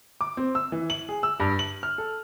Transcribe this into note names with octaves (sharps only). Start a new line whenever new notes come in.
D6
C4
E6
E3
F#7
G#4
E6
G2
F#7
F6
A4